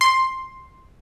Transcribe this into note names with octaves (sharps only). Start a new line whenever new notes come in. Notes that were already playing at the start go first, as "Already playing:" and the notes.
C6